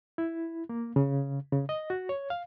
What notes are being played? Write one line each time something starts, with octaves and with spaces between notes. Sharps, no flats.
E4
A#3
C#3
C#3
D#5
F#4
C#5
F5